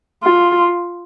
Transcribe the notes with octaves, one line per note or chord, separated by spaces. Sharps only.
F4